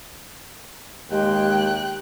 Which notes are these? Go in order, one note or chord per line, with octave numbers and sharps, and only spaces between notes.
D#2 G#3 G4 G5 F#6